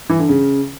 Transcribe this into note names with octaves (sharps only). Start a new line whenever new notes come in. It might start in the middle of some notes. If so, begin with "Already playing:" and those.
E3
D3
C#3